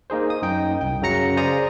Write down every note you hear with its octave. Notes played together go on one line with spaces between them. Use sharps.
A#3 D#4 G#4 C5
D#6
F#2 D#4 G5
C2 G5
F#2 C#3 F#3 A#5 A#6 C#7
G#4 C5 D5 F5 A#5 D#6